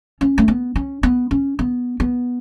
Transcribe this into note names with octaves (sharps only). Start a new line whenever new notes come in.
C#4
A3
B3
C#4
B3
C#4
B3
B3